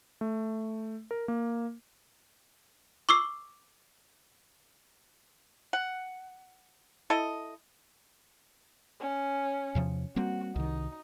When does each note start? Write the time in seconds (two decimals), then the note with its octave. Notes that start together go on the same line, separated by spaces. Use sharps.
0.21 A3
1.11 A#4
1.28 A#3
3.09 C#6 D6 E6 C7
5.73 F#5
7.10 E4 A4 D#5
9.00 C#4
9.75 E2 C3 F3
10.16 G3 A#3 C4 F#4
10.56 C2 D#3 D#4